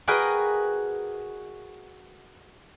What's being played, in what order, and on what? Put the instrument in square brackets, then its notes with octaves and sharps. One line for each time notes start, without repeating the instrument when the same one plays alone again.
[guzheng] F#4 G#4 A#4 B4 D#5 G5